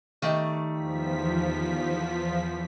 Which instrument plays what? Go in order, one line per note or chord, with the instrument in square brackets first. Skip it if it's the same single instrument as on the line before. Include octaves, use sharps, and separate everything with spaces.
[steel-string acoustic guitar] D#3 G3 A3
[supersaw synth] E2 F3 B6